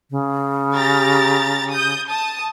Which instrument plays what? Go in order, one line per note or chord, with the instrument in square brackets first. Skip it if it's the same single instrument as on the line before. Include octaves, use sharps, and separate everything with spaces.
[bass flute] C#3
[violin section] G4 A#5 A6
D#6 G6
A5 D#6